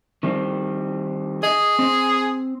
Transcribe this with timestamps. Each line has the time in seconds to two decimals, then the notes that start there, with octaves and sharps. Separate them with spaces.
0.23 D#3 G3 C4
1.43 G#4 D#5
1.79 C4